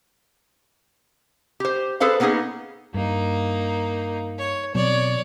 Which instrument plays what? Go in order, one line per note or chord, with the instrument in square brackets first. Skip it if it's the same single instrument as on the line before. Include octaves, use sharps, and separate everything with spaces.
[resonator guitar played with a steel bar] G4 C5
G#4 A4 B4 C5 F5
A#3 B3 C#4 D#4 G#4
[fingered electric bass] G2 [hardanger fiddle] A#3 D#4
[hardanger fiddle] C#5
[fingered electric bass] B2 F#3 C4 [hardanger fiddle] C#5 D5